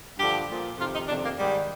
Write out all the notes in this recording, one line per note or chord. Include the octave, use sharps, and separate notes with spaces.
G2 D3 F3 G4
A#2 F3
F2 C3 D#3 F4
D#4
F2 C3 D#3 D4
A#3
G#2 D#3 G3